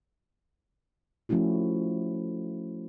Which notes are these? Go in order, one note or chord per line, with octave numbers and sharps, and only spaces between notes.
F3 A3 C#4 E4 F#4